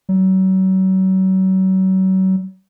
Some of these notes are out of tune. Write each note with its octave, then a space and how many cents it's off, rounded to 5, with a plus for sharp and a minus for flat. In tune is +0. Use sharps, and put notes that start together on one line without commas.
F#3 +35